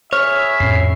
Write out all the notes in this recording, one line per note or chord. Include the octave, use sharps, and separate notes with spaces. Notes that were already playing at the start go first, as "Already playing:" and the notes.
E4 G#4 C#5 E5 F6
F2 A2 C#4 C7